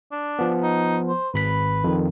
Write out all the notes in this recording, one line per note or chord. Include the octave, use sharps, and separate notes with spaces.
D4
F3 B3
D#4
C5
G#1 B4 B5 B6
F2 D#3